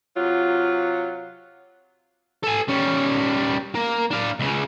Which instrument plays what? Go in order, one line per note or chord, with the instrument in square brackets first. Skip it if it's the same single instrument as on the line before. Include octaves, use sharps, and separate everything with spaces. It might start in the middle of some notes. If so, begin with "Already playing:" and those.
[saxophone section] C3 F#3 F4
[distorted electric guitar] A4 G#5
G3 C#4
A#3
D4 F5
C#2 C#3